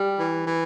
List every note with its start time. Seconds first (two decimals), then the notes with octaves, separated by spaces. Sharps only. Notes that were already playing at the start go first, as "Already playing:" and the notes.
Already playing: G3
0.19 E3
0.47 E3